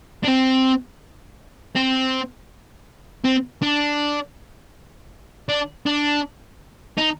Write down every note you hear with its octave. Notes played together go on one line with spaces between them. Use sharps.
D4
C4
C4
C4
D4
D4
D4
D#4